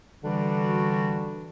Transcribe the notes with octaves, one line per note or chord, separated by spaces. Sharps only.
D3 E3 G3 D4 F#4